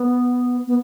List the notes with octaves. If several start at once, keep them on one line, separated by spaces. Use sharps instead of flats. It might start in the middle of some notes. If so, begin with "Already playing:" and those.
Already playing: B3
B3